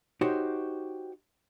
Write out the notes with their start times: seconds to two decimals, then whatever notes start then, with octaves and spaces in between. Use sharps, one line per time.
0.21 D#4 F#4 G4 C5 C#5